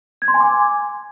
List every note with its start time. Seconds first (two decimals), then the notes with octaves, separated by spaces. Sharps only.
0.22 G#6
0.28 C6
0.34 G#5
0.40 D6